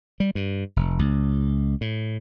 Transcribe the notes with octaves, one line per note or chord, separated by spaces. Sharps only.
G3
G2
F1
C#2
A2